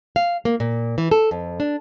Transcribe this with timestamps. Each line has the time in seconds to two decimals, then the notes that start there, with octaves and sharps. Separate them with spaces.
0.16 F5
0.45 A#3
0.60 A#2
0.98 E3
1.11 A4
1.31 F2
1.60 D4